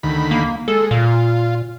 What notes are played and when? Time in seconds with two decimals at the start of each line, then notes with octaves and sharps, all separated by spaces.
0.03 D2 D#3 B5
0.31 A#3
0.68 G#3 A4
0.91 A#2 F4